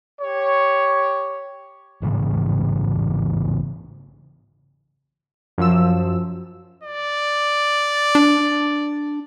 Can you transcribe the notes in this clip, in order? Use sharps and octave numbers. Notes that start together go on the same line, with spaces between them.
G4 C#5
A1 G#2 C#3 E3
F#2 F3 E6
D5
D4